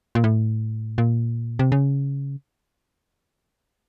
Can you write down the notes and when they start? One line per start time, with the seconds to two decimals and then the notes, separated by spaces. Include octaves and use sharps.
0.15 A#2
0.24 A2
0.98 A#2
1.59 C3
1.72 C#3